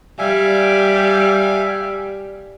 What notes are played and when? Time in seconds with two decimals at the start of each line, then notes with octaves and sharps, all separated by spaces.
0.19 G3 E5 F5 G#5